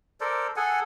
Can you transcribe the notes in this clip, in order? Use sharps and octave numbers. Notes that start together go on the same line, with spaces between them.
A4 A#4 C5 D5
G#4 A4 F#5 G#5